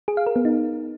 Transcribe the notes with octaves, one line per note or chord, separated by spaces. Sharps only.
G#4
F5
A#4
B3
D#4